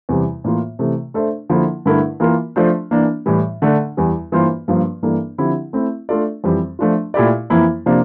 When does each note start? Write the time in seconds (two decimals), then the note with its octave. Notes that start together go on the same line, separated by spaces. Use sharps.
0.09 E2 C3 E3 G3
0.44 A2 E3 A#3 F4
0.79 C3 E3 A3
1.14 A3 D4 A4 C5 E5
1.49 D3 F3 A#3 E4 A4
1.85 G2 D3 A3 E4 A#4
2.20 E3 A#3 F4 A#4
2.56 F3 A3 D4 F4 C5
2.91 E3 A#3 D4
3.26 A2 E3 G3
3.62 D3 A3 D4 A4
3.97 E2 E3 G3
4.32 G2 E3 A#3 F4 C5
4.68 G2 F3 A#3
5.03 G2 E3 A#3 D4 A4
5.38 D3 F3 C4 E4 G4
5.73 A3 C4 E4
6.09 A3 D4 F4 A4 D5
6.44 F2 E3 G3 C4
6.79 F3 A3 D4 F4
7.14 A#2 A3 E4 G4 D5
7.50 F2 E3 A#3 E4
7.86 C3 F3 A#3 D4